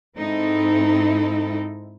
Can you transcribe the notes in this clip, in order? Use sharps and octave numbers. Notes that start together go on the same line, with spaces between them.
G#2 C4 D#4 E4 A4